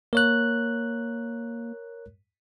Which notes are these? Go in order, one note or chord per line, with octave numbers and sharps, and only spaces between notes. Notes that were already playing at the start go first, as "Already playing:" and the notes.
A#3 A#4 C#5 F#6